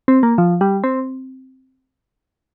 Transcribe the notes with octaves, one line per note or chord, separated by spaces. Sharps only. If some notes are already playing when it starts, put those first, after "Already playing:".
C4
A#3
F3
G3
C4